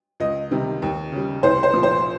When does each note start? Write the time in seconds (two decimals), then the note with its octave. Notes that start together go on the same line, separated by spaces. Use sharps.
0.20 C#2 D#5
0.51 C3 D#3 G3
0.82 D#2
1.12 C#3 G3
1.43 C2 C5
1.63 C5
1.74 A#2 F3
1.83 C5